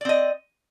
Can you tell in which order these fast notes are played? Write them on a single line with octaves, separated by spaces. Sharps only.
D5 C4 D#5